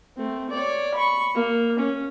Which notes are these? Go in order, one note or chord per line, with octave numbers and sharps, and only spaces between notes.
A3 C4
C#5 D5
B5 C#6
A#3
C#4